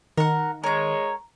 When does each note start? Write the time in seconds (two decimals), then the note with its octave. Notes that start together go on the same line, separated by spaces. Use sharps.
0.17 D#3 A#4 F#5
0.64 G#3 A#4 C#5 A#5